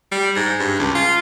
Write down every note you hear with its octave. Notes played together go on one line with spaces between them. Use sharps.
G3
G#2
G2
C#2
F4